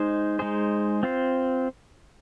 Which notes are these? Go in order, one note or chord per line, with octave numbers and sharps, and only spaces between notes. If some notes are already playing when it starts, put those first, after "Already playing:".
Already playing: G#3 D#4 C5
G#3 D#4 G#4 C5
C4 F4 C5